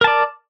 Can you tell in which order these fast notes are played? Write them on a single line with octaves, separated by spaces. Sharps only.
A#4 A5 D5